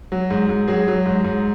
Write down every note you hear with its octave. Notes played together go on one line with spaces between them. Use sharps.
F#3
G#2
G#2
F#3 G#4
F#3
G#2
G#2